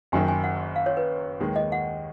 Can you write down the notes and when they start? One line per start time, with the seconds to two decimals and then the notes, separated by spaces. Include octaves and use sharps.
0.12 F#1 F#2 D#3 G#5
0.28 G#5
0.44 F#5
0.76 F5
0.86 C#5
0.97 B4
1.40 D#2 D#3 G#3
1.56 D#5
1.72 F#5